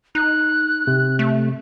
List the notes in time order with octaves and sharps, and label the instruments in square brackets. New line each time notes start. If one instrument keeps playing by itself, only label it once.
[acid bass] D#4 [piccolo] F#6
[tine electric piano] C3
[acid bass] A3